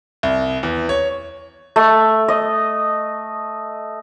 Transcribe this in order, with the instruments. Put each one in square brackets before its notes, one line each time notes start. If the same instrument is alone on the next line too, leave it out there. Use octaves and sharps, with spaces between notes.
[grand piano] C2
E2
C#5
[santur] A3
D#5